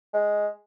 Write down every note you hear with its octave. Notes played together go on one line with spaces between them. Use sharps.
G#3